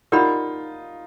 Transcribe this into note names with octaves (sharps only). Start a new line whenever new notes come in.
D#4 F4 G4 A#4 D5 F#5 B5